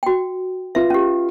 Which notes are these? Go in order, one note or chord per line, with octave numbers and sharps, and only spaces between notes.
F#4 G5
F4 B4 E5
C#4 G4